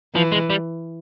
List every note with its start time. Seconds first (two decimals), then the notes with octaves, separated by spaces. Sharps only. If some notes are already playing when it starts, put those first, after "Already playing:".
0.15 E3 F3
0.32 G#3
0.50 G3